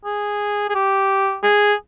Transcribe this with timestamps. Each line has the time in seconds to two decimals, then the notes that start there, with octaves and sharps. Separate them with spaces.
0.05 G#4
0.69 G#4
0.75 G4
1.43 G#4